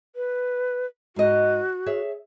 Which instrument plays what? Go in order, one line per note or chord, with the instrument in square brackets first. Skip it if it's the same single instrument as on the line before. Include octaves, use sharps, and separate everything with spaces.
[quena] B4
[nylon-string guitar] G#2 D#5 [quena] F#4
[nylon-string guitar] G#4 C#5 E5